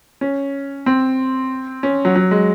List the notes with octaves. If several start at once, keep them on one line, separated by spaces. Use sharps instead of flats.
C#4
C4
C#4
F#3
F#3
G#3